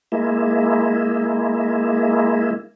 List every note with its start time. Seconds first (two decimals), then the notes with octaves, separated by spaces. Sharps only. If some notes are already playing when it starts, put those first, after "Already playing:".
0.12 G#3 A#3 E4